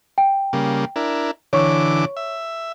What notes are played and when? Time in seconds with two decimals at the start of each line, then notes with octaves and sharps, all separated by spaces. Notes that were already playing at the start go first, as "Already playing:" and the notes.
0.18 G5
0.53 C#3 G3 A#3
0.96 D4 E4 A#4
1.53 D3 E3 C#5 C#6 D6
2.17 E5